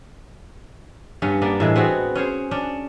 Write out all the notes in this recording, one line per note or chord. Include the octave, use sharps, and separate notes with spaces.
G2 B3 C#4
A#3 B3 D4
A2 E3 G#3
B3 C4 F#4 G#4
C#4 G#4 C5
C#4 D4